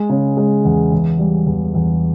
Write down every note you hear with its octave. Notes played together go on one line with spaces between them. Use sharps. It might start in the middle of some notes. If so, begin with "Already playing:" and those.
Already playing: G#3
C#3
G#3
E2
E2
G3
E2
E2